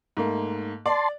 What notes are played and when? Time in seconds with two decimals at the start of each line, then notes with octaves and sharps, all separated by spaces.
0.17 G#2 A3 A#3
0.86 D5 A5 C6